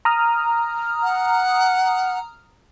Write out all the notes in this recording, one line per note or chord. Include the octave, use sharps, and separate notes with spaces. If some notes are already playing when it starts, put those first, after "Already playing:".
A#5 D#6 F6
F#5